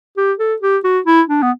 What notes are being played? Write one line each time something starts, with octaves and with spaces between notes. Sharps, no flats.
G4
A4
G4
F#4
E4
D4
B3